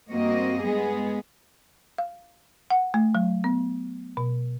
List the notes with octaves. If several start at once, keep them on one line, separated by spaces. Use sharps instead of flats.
G2 A#3 C4 F#4 D#5
G#3 B3 G#4
F5
F#5
A3
F#3
B3
B2